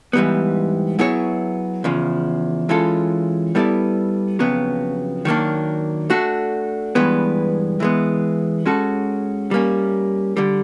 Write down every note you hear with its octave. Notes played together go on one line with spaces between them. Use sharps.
G#2 E3 G3 B3
F#3 B3 E4 G#4 C#5
E2 C#3 F3
E3 G#3 C#4 F4 A4
G3 B3 E4 A4 D5
F2 C#3 F#3 B3
D#3 F#3 A#3 D4
A3 D4 F#4 A4
G2 E3 G#3 B3
E3 G#3 B3
G#3 C#4 F#4 A4
G3 A#3 C#4
D3 G3